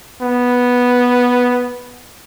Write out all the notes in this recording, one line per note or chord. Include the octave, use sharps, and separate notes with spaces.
B3